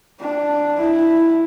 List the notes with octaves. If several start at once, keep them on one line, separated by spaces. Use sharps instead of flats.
D4
E4